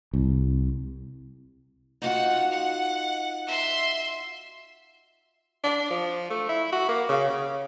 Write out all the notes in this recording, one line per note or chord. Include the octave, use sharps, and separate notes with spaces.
C2
D#4 F4 F#4 F#5
F#5
E5 C6
D4
F3
A3
E4
F#4
A#3
C#3
C#3